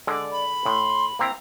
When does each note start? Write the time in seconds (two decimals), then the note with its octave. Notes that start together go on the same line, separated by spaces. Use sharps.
0.07 D3 G#3 D5
0.32 B5
0.65 A2 C6
1.19 A#3 C4 E4 A#5